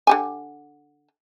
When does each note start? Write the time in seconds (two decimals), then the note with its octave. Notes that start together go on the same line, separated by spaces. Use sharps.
0.07 D3 G4 G#5